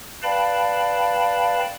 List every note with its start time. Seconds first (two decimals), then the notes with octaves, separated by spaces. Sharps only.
0.23 B4 D5 F5 G5 A5 B5